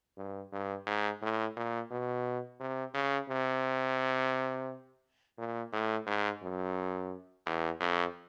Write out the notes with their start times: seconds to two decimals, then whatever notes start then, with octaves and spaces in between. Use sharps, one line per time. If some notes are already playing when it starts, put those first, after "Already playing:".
0.17 G2
0.52 G2
0.87 G#2
1.22 A2
1.56 A#2
1.91 B2
2.60 C3
2.94 C#3
3.30 C3
5.38 A#2
5.72 A2
6.07 G#2
6.42 F#2
7.46 E2
7.80 F2